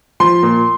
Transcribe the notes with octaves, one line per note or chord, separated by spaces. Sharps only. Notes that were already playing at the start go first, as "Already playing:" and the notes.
F3 C6
A#2